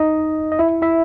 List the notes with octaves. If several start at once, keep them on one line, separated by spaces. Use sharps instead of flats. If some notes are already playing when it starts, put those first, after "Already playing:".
Already playing: D#4 D#5
D#5
E4 E5
E4 E5